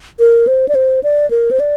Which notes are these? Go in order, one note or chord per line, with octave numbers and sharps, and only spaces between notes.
A#4
C5
D5
C5
D5
A#4
C5
D5